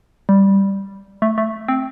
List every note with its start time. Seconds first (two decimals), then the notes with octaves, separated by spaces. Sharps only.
0.29 G3
1.22 A3
1.38 A3
1.68 C4